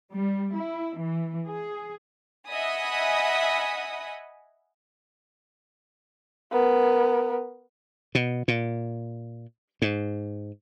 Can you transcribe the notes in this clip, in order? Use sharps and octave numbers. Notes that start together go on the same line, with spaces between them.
G3
E4
E3
G#4
D#5 E5 F#5 G#5 B5 D#6
B3 A#4
B2
A#2
G#2